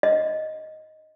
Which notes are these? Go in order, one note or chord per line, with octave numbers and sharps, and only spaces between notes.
D#5